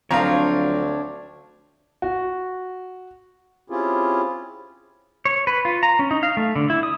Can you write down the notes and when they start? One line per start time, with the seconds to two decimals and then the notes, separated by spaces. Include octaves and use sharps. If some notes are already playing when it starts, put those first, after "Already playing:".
0.11 D2 F3 F#3 C4 D4 C#5 F5 A#5
2.02 F#4
3.70 C4 C#4 E4 F4 G4 G#4
5.25 C#5
5.47 B4
5.65 F4
5.83 A#5
5.99 C#4
6.11 D#4
6.23 F5
6.37 A3
6.56 D3
6.70 E4
6.83 D#6